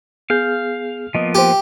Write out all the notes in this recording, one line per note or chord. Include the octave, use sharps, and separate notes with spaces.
B3 G#4 F5 G6
F3 A#3 B3 D#5
G4 C5 G5